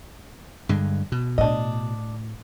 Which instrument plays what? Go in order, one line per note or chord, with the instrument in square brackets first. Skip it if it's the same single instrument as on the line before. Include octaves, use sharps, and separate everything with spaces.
[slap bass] G2 D3 G#3
B2
[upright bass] A2 [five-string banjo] D4 D#5